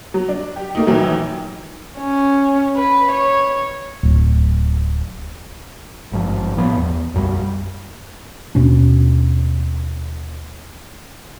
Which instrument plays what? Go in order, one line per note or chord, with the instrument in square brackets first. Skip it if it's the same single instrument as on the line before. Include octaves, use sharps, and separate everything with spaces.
[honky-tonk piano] F#3
D4
G4
A3 A#3 D#4
A#1 D#3 E3 F#3
[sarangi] C#4
B4
C#5
[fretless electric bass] D1
[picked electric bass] G#1 G2 F3
A2 F3 B3
E2
B1 F#2 F#3 G3
[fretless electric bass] D#2 B2 C#4 D4